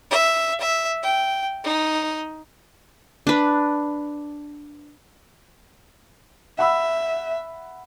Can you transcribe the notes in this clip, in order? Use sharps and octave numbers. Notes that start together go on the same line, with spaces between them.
E5
E5
G5
D#4
D4 B4
E5 F#5 B5 E6